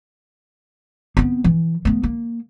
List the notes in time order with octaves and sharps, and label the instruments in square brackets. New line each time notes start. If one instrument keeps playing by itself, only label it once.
[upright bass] B3 C4
E3
A3 B3
A#3